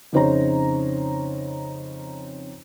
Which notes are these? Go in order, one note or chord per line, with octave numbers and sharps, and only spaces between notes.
F2 C#3 D#4 C5 C#5 A#5